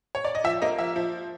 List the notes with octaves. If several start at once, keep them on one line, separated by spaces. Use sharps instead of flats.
C#5
D5
D#5
F3 E5
A#3 D#5
F3 E5
F3